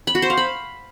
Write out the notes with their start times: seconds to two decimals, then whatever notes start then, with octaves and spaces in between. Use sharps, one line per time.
0.07 B5
0.15 F#4
0.22 C5
0.30 F5
0.37 B5